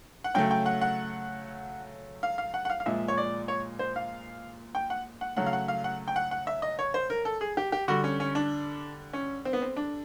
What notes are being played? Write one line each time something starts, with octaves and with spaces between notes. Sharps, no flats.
F#5
C#3 F#3 A3 G5
G5
F#5
F#5
F5
F5
F#5
F#5
F5
F5
A#2 F3 G#3 E5
C#5
D5
C#5
C5
F5
G5
F#5
F#5
C#3 F#3 A3 F#5
F5
F#5
F5
F#5
G5
F#5
F#5
E5
D#5
C#5
C5
A#4
A4
G#4
G4
G4
D3 G3 F#4
C#4
C#4
D4
C#4
C4
B3
C4
D4